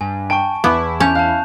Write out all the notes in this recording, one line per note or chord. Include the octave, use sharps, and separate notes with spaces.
G2 G#5
G5 A5 C#6 D7
E2 B3 E4 D6
C#4 A5 G6 F7
F5 A5 F#6